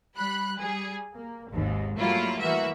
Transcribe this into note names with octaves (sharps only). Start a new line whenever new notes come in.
G3 B5 F#6
G3 G#4
A#3
G#1 D#2 G#2
F#3 G3 A3 A#3 E4 F4
E3 A#3 F#4 E5